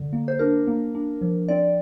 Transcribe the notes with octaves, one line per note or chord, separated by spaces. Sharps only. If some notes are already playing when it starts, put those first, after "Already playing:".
Already playing: D3
A#3
C5
D4 A#4
A#3
D4
F3
C4 D5